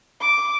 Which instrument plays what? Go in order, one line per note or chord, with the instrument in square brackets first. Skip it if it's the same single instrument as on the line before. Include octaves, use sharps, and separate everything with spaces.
[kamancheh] D6